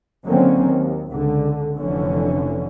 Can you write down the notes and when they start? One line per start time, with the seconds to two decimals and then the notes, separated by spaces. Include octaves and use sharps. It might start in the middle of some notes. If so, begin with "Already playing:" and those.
0.26 D3 D#3 F#3 A#3 C4 C#4
0.66 D#2
1.12 C#2 D3
1.77 F1 D3 E3 C#4